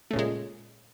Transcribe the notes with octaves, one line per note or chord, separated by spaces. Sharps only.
A#2 C#3 G#3 A3